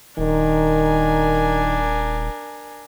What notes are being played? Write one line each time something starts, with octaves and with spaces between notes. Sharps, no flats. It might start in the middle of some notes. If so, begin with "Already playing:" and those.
D#1 D#3 D4 A#4 G#5